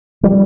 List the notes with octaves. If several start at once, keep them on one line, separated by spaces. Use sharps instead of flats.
F3 G3